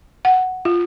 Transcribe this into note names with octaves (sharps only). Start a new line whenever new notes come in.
F#5
F4